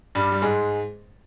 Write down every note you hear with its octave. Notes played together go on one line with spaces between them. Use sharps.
G2 G3
G3
G#2 G#3